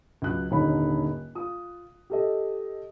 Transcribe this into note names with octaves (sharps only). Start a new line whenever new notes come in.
C#2 F#3 F#6
D#1 G#2 D3 D#4 C#5 B5
F4 D#6
G4 A4 D#5